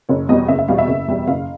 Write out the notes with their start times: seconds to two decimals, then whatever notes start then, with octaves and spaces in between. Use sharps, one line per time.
0.09 F#1 C#5
0.29 E2 B2 G3 D#5
0.48 F#1 E5
0.59 E5
0.68 E2 B2 G3 F5
0.78 E5
0.88 F#1
1.08 E2 B2 G3
1.27 F#1 F5